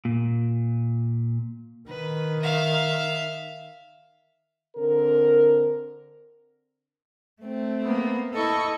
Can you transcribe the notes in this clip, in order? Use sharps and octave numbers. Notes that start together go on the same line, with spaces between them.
A#2
D#3 B4
E5 F5
D3 C4 A#4
A3 C4
A#3 B3
E4 A4 D#5 C#6